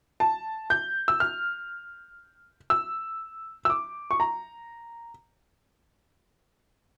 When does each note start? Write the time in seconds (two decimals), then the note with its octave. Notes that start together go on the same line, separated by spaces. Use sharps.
0.20 A5
0.70 G6
1.08 E6
1.20 F6
2.70 E6
3.65 E6
3.70 D6
4.11 C#6
4.20 A#5